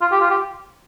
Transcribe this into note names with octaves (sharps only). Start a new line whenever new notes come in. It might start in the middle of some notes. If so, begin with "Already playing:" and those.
F4
G4
F4
G4